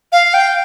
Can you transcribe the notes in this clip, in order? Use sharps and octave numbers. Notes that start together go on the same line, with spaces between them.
F5
G5